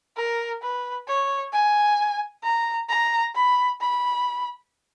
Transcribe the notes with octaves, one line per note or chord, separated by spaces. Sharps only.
A#4
B4
C#5
G#5
A#5
A#5
B5
B5